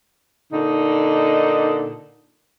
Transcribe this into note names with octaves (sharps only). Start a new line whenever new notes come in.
A#2 D3 D#4